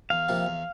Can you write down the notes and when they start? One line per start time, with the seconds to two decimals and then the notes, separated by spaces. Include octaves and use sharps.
0.10 E2 F5
0.29 C3 F3 A#3
0.46 E2